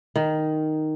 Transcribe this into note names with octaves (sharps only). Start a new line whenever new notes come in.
D#3